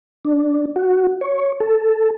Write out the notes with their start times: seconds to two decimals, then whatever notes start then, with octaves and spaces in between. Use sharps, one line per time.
0.25 D4
0.76 F#4
1.21 C#5
1.60 A4